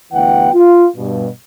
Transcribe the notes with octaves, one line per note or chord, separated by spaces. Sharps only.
D2 E3 G3 B3 F#5 G5
F4
G2 B2